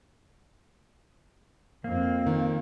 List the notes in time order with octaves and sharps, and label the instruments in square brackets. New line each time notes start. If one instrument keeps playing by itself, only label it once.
[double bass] F2 C4 [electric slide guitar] A#3
[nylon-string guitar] D#3